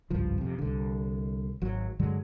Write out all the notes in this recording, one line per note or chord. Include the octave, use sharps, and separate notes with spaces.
G#1 C#2 G2 F3
F2 C3
C2 D3
G#1 F#3
G2 D3 F#3 G#3